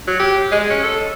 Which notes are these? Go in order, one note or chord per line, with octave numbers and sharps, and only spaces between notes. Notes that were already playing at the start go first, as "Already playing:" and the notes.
F#3
G4
G#3
C#4
A4